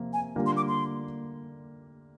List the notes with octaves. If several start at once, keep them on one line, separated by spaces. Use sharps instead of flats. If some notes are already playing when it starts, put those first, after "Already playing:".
Already playing: C3 F3 A#3
G#5
D3 G3 A#3 F4
C6
D6
C6